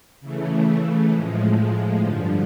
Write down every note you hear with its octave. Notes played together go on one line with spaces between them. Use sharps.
C#3 E3 A3
A2 F3 G#3
G2 D3 F3